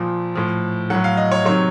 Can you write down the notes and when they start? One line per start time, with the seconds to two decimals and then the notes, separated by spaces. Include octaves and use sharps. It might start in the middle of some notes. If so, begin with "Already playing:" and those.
Already playing: A#2 F3
0.35 A2 F3
0.90 A2 F#3 F#5
1.04 F5
1.17 D#5
1.32 C#5
1.45 C3 D#3 F#3 C#5